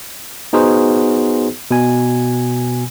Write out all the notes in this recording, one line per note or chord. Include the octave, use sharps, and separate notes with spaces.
B3 D#4 F#4 G#4 C5
B2 G#5